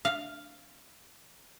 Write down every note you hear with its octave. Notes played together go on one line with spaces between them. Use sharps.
F5